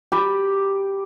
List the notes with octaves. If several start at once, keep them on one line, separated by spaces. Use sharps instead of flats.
G4 B5